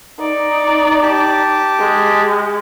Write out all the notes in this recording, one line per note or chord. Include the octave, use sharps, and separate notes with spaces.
D#4 D5
G4 A5 D6
G#3